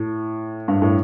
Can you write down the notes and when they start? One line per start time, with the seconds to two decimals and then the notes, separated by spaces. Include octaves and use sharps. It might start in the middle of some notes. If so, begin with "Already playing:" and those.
Already playing: A2
0.68 G2
0.82 A2